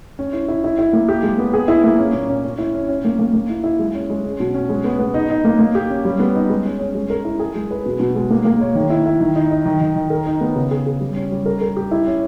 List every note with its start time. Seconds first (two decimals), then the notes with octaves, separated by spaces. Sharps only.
0.19 C#4
0.33 E4
0.48 E4
0.64 E4
0.79 E4
0.93 A#3
1.09 G4
1.23 G#3
1.38 B3
1.53 G#4
1.68 E4
1.84 A#3
1.99 C#4
2.13 A#2
2.29 C#4
2.44 C#4
2.58 E4
2.74 C#4
2.89 C#4
3.05 A#3
3.19 A#3
3.33 A#3
3.50 E4
3.64 E4
3.79 G#3
3.95 C#4
4.10 G#3
4.24 C#4
4.40 B2
4.54 C#4
4.69 G#3
4.84 B3
5.00 B3
5.14 D#4
5.30 D#4
5.45 A#3
5.59 A#3
5.75 G4
5.90 C#4
6.05 G3
6.20 B3
6.35 D#4
6.49 G#3
6.65 C#4
6.79 C#4
6.95 G#3
7.10 A#4
7.25 E4
7.39 G#4
7.55 G#3
7.71 B4
7.86 B2
8.00 B2
8.15 G#3
8.31 A#3
8.45 A#3
8.61 C#5
8.75 D#3
8.90 E4
9.06 E4
9.20 D#3
9.36 D#4
9.51 D#4
9.65 D#3
9.81 D#3
9.96 D#3
10.10 A#4
10.26 D#4
10.41 B3
10.56 C#3
10.71 G#4
10.86 G#4
11.00 G3
11.16 C#4
11.32 G3
11.46 A#4
11.61 A#4
11.77 G4
11.91 E4
12.06 C#4